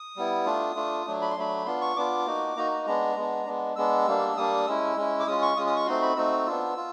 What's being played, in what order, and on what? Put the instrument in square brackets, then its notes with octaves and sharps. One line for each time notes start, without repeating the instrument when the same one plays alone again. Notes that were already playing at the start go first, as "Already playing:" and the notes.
Already playing: [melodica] D#6
G3 B3 E4
A3 D4 F4
A3 D4 F4
F#3 A3 D4
B5
C6
F#3 A3 D4 B5
B3 D4 F4 C6
C#6
B3 D4 F4 D6
A#3 D#4 F#4
A#3 D#4 F#4 A#5
A#5
G#3 B3 D4 A#5
G#3 B3 D4
G#3 B3 D4
G#3 B3 D4 E6
G3 A#3 D4
G3 A#3 D4 D#6
G#3 C#4 E4 E6
G#3 C#4 E4
D6
G#3 C#4 F4 D#6
C#6
G#3 C#4 F4 D#6
D#6
C#6
A3 C4 D#4 F#4 C6
B5
A3 C4 D#4 F#4 E6
B3 D4 F4
F4